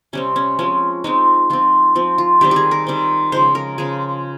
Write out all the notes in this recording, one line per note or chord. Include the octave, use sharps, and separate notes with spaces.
C3 G3 C4 C#4
C#4
F3 G#3 C4 C#4
F3 G#3 C4 D#4
F3 C4 F4
F3 C4
F4
D#3 G3 C4 G4
G4 G#4
A#4
D#3 G3 C4
C#3 F3 G#3 C5
A#4
C#3 F3 G#3 G#4